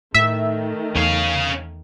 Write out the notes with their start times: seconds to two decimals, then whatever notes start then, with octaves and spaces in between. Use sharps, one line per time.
0.14 A2 D#3 A3 E5
0.95 E2 C#4 F5